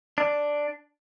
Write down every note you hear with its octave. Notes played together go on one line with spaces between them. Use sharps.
D4